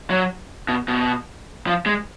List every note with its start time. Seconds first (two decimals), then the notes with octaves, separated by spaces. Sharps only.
0.10 F#3
0.69 B2
0.88 B2
1.67 F3
1.86 G#3